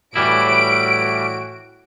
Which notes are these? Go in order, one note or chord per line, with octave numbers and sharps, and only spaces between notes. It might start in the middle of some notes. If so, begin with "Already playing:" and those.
A2 E3 G3 E4 F#4 D7